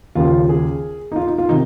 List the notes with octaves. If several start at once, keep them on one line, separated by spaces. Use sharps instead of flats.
D#2 C#3 F3 F4
G#4
D#4
F4
D#4
F4
C3 D#3 D#4